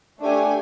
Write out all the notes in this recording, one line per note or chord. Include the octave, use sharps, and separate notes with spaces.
A3 D4 G4 G#5